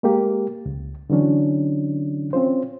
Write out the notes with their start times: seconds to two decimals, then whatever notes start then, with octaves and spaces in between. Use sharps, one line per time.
0.03 G#3 A#3 G4
0.66 C#2
1.10 D3 E3 F#3 C#4 D4
2.33 C4 C#4 F4 C5